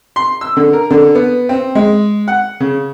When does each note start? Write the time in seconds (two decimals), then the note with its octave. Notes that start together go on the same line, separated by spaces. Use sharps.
0.16 C6
0.41 E6
0.57 D3
0.73 A#4
0.90 D3
1.15 B3
1.49 C4
1.75 G#3
2.28 F#5
2.60 C#3